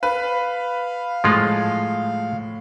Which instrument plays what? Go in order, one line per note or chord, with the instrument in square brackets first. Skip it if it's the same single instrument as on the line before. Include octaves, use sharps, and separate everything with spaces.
[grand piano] B4 [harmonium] F5
[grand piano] A2 [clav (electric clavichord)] F3 G#3 F4